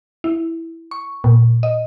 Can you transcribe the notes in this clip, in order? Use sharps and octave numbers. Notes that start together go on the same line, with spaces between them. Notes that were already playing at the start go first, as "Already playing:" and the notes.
E4
C#6
A#2
D#5